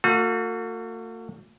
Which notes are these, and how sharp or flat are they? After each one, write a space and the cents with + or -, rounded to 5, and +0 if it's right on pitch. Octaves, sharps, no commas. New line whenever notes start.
A3 +45 F#4 -40